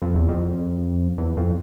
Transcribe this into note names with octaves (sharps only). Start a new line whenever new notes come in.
F2
E2
F2
E2
F2